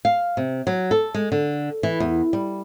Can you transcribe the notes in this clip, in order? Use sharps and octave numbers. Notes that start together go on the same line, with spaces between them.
F5
C3
F#3
A4
G#3
D3
E3
E2
G3